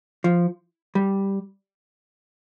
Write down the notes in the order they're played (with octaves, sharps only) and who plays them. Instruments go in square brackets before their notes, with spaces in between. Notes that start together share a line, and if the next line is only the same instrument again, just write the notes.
[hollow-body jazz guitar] F3
G3